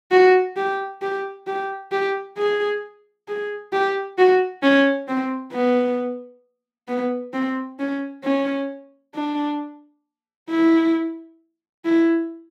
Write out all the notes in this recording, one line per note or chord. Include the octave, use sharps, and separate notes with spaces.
F#4
G4
G4
G4
G4
G#4
G#4
G4
F#4
C#4
C4
B3
B3
C4
C#4
C#4
D4
E4
E4